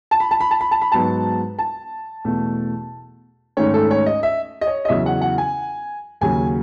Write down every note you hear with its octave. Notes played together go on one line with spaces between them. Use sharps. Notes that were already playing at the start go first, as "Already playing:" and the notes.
A5
B5
A5
B5
A5
B5
A5
B5
G#2 F#3 B3 D#4 A5
A5
E2 B2 A3
G#2 D#3 A3 C#4 C#5
A4
C#5
D#5
E5
D#5
C#5
D#5
E2 C#3 F#3 E5
F#5
F#5
G#5
D#2 C#3 F#3 G#5